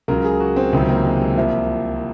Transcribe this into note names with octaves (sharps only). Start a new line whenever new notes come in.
C#2 C#3 F#3 A#4
G#4
F#4
C4
C#2 C3 D#3 F#3 C4
A#3
G#3
G#3
C2 C3 F3 A#3